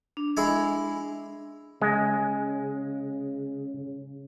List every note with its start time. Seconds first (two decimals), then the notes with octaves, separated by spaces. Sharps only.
0.17 D4
0.37 G#3 E4 G#5
1.82 C#3 G#3